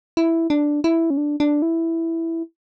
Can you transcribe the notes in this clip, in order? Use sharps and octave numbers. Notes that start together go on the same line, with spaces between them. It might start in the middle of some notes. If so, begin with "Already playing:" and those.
E4
D4
E4
C#4
D4
D4
E4